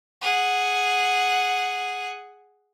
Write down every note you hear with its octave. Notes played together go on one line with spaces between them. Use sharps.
G#4 F#5